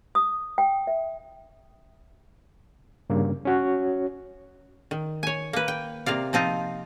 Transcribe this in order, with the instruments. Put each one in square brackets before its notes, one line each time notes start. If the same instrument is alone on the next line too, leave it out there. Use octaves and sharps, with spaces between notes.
[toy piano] D#6
G5
E5
[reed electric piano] G2 C#3 A#3
C#4 F#4 C#5
[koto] D#3
C#5 G#5
A#3 B4
G5
C3 A#3 D5 F5
F3 C4 D#4 F4